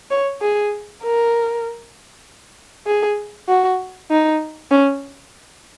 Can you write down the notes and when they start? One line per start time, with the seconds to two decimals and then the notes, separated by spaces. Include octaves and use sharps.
0.11 C#5
0.41 G#4
1.03 A#4
2.87 G#4
3.49 F#4
4.11 D#4
4.71 C#4